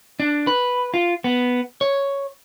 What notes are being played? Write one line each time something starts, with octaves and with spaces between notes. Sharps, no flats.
D4
B4
F4
B3
C#5